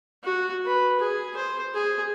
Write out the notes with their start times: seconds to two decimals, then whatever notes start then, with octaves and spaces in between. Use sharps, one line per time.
0.24 F#4
0.65 B4
1.00 G#4
1.36 C5
1.74 G#4